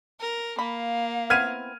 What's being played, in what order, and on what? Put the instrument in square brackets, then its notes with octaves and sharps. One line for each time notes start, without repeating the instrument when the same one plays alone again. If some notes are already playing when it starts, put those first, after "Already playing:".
[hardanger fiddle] A#4
[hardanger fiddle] A#3 [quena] F5 [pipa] B5
[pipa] B3 C4 E4 [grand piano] F6 G#6 D#7